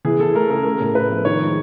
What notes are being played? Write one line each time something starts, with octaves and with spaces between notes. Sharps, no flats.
E3 G#4
E3 A4
A3 A#4
C#3 A#4
A3 A#4
A2
A3 B4
F3
D#3 C#5
G#3